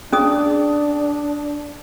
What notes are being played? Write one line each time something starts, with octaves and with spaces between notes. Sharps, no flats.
C#4 D4 G#4 D#6